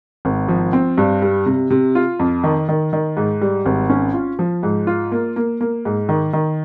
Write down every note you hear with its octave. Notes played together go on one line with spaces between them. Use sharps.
G#1
F3
C4
G2
G3
C3
C3
F4
F2
D#3
D#3
D#3
G#2
G3
G#1
C#4
F4
F3
G#2
F4
A#3
A#3
A#3
G#2
D#3
D#3